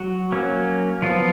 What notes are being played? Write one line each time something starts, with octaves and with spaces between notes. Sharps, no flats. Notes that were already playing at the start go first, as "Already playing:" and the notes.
Already playing: F#3 F#4
F#3 A#3 C#4
F3 F#3 B3 F4